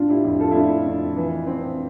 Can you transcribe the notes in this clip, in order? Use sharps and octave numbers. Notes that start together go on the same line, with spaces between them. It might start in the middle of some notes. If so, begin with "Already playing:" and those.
Already playing: A2 D3 D4 F4
E4 G4
F2
F4 A4
E4
A3 D4 F4
F2
E3
C4